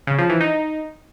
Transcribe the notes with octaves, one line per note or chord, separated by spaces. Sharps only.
C#3
F3
E3
D#4